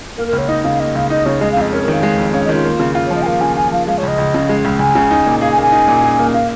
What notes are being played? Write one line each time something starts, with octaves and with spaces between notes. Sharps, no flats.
A#3 A#4
A#4
C#2 C#5
D#4 D#5
C#3 F5
A#3 D#5
C#2 F5
D#4 D#5
C#3 C#5
G#3 D#5
F5
F2 D#5
C#4 A#4
A#4
D#3 F5
G#3
F2
C#4 F5
D#5
D#3 F4
A#3
C#3
F4
C#5
F3 D#5
G#5
A#3 F5
C#3 G#5
F4 G#5
F3 F5
G#3 F5
C#5
C#2 D#5
C#2
C#3
G#3
C#2
C#2 G#5
C#3
D#4
A#2
G#4 F5
G#5
A#3
G#5
D#4
A#2
G#4
A#3
A#3 F5